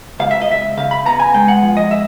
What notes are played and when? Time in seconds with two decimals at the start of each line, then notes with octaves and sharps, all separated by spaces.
0.20 C#2 F5
0.31 E5
0.42 D#5
0.48 C#2 E5
0.77 C#3 F5
0.91 B5
1.06 B3 A#5
1.20 G#5
1.34 G#3 G5
1.48 F#5
1.63 F3
1.77 D#5
1.91 E5